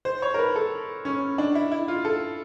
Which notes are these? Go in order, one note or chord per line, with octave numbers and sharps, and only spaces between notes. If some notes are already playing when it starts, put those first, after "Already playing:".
C5
C#5
A#4
B4
A4
C#4
D4
E4
E4
F4
A4